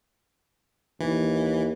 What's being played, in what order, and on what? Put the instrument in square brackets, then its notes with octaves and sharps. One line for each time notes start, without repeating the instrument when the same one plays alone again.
[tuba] D#2 [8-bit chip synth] E3